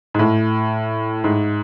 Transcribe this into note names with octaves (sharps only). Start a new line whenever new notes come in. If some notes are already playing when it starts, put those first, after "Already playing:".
G#2
A2
G#2